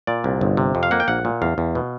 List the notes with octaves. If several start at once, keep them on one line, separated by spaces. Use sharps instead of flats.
A#2 D5
C2
G1
C3
F2
F5
A#3 F#5
G5
A#1 F#5
A#2
E2 F5
E2
B2